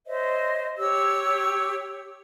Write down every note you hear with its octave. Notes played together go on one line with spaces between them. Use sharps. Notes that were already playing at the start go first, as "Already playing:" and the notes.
C5 C#5 D#5 E5
G4 C#5 E6